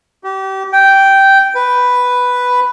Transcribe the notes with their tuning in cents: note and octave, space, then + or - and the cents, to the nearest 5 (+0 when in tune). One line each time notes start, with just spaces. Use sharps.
G4 -30
G5 -10
B4 +0